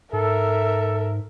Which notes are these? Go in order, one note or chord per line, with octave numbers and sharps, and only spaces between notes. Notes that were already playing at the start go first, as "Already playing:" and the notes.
G#2 A4 A#4 E5